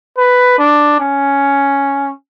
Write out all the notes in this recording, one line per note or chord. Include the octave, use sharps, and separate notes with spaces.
B4
D4
C#4